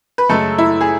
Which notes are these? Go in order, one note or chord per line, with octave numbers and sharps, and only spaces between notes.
B4
F#2 C#3 G#3 A3 A4
E4
G#4